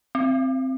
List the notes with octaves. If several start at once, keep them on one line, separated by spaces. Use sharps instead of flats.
C4